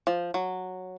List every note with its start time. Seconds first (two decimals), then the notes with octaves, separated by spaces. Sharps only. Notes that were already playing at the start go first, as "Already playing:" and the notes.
0.07 F3
0.34 F#3